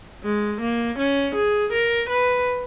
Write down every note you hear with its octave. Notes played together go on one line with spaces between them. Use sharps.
G#3
A#3
C#4
G#4
A#4
B4